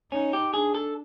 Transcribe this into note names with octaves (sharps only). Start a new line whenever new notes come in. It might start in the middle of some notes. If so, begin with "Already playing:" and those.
C#4 D#4
G4
D4 G#4
A4